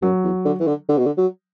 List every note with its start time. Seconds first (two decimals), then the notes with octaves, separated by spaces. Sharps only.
0.02 F#2 F#3
0.24 E2
0.45 D3
0.60 E3
0.67 D3
0.89 D3
0.98 B2
1.06 D3
1.18 F#3